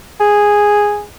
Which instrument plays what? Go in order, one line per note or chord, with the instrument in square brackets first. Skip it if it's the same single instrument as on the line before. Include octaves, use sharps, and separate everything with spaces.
[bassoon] G#4